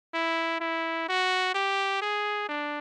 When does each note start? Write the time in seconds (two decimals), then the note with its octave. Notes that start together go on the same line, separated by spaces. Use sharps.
0.14 E4
0.60 E4
1.08 F#4
1.54 G4
2.02 G#4
2.49 D4